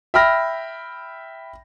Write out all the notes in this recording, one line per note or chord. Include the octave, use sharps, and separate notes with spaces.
E5 G5 B5 F6 A#6